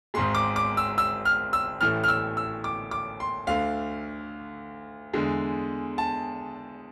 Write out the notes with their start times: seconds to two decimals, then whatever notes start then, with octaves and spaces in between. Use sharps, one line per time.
0.14 G#1 G#2 G#3 C6
0.35 D6
0.56 D6
0.77 E6
0.98 E6
1.25 F6
1.53 E6
1.81 A1 A2 E3 A3 F6
2.04 F6
2.08 E6
2.37 E6
2.64 D6
2.91 D6
3.20 C6
3.47 D2 D3 A3 F5
5.14 E2 D3 G#3
5.98 A5